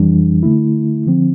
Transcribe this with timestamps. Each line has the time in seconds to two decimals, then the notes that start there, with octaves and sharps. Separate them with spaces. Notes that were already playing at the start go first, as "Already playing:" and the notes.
Already playing: F2 E3 G3 D4
0.43 D3 A3 E4
1.06 D3 F3 C4